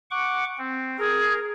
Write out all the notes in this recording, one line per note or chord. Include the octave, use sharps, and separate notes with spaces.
F#5 C#6 D6
C4
G#4 A#4